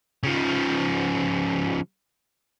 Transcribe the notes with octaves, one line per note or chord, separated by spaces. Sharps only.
C#3 F3